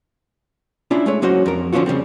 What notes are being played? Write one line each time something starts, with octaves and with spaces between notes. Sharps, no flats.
C#4 D4 E4 F4
G#3 A3 C#5
F#3 A#3 C#4 F#4 C5
F2 A#4
D3 F3 C#4 D4 F4 F#4
F2 C#3 G3 C4